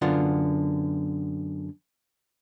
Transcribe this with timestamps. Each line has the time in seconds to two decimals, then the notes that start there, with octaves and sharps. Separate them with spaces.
0.02 F#2 D3 B3 F4